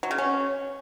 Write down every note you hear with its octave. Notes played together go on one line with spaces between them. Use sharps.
F#3
C#3
C#4